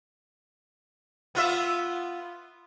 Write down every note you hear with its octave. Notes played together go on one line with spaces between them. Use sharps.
B3 F4 E5